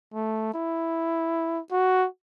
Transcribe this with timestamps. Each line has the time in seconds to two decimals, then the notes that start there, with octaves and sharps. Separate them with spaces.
0.14 A3
0.54 E4
1.71 F#4